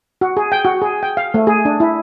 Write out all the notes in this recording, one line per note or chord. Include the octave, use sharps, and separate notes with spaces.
F#4
G#4
G5
F#4
G#4
G5
F5
A3
G#4
D4
E4